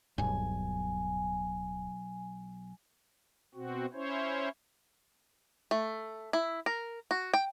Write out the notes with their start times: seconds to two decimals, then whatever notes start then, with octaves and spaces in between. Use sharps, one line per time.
0.18 D1 B1 G2 G#5
3.55 B2 C4 F#4
3.93 C#4 E4 C5 C#5
5.71 A3
6.33 E4
6.66 A#4
7.11 F#4
7.34 G5